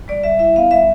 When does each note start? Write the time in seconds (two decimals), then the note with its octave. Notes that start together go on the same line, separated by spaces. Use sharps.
0.08 G3 D5
0.23 G3 E5
0.39 E4 E5
0.56 B3 F5
0.71 G3 E5